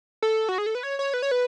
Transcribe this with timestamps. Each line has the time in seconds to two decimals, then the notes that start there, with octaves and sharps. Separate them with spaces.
0.22 A4
0.49 F#4
0.58 G#4
0.66 A4
0.75 B4
0.83 C#5
0.99 C#5
1.14 B4
1.22 C#5
1.31 B4